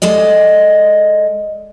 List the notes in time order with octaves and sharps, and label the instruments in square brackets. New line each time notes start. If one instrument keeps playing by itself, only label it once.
[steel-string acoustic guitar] G#3 A4 D5 D#5